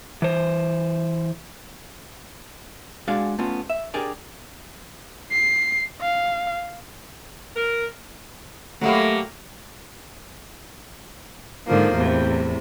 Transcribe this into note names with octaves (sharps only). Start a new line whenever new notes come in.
E3 C5
G#3 D4 F#4 G#4 D5 F5
A3 B3 C#4 F4
E5
D4 G4 G#4 A#4 D5
C7
F5
A#4
F#3 G3 A3 A#3
G#2 D3 D#3 F3 A#3
E2 A2 C3